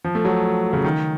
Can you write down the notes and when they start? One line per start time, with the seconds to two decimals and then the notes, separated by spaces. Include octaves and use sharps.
0.04 F3
0.15 A3
0.25 F#3
0.73 C#3
0.84 D#3